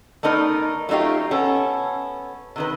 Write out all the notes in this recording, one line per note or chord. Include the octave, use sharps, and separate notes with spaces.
A3 B3 D#4 A#4 D5
F#3 A3 D#4 F4 G4
B3 C#4 A4
C3 D#3 B4